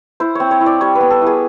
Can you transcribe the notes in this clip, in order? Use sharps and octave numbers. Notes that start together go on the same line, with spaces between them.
E4 C5
C4 C#5
C#5
E4
D5
G3 C#5
B4
B3
A4
E4 G#4